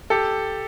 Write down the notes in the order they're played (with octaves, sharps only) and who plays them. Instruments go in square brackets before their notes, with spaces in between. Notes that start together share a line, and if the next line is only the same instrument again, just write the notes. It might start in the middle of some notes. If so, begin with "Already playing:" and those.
[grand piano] G4 A4